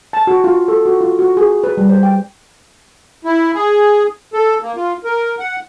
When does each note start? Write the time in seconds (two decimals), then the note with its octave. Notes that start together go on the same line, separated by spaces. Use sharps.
0.13 A5
0.27 F#4
0.44 F4
0.68 A4
0.86 F#4
1.01 F4
1.19 F#4
1.37 G#4
1.64 B4
1.77 G3
1.89 C5
2.03 G5
3.25 E4
3.54 G#4
4.33 A4
4.62 A#3
4.76 F4
5.04 A#4
5.39 F#5